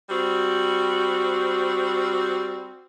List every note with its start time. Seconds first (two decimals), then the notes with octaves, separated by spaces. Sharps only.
0.10 G3 C4 F#4